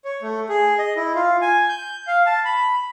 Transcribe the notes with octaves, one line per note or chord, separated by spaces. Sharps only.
C#5
A3
G#4
D#5
E4
F4
G#5
G6
F5
A5
B5